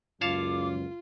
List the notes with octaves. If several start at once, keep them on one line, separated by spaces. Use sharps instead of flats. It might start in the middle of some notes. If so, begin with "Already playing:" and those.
F#1 C#2 F#2 F4 C#5 F5 A5 D6